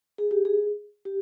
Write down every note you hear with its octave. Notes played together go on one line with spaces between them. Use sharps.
G#4
G4
G#4
G4